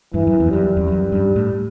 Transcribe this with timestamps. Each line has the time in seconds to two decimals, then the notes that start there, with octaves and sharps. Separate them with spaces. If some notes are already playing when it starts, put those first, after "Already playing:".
0.14 G2 E3
0.27 F#2
0.40 E2
0.51 F#2 G3
0.77 E2
0.88 F#2
1.12 G2
1.36 A2